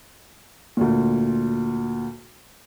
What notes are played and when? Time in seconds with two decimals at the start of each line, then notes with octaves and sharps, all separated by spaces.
0.77 D2 A#2